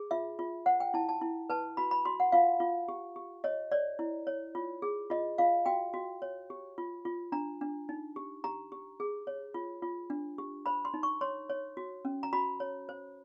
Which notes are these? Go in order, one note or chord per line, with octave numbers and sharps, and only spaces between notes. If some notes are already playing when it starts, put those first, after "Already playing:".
Already playing: G#4
F4 E5
F4
C5 F#5
G5
E4 A5
A5
E4
B4 A5
F#4 B5
B5
F#4 C6
F#5
F4 F5
F4
G4
G4
C#5 D#5
C#5 D5
E4
C#5
F4
G#4
F4 D#5
F4 F5
F#4 G5
F#4
C#5
G4
F4
F4
D4 A#5
D4
D#4
G4
G4 A#5
G4
G#4
C#5
F4
F4
D4
G4
C5 B5
C6
D#4
C#6
C#5 C6
C#5
F#4
C#4
A#5
F#4 B5
C#5
C5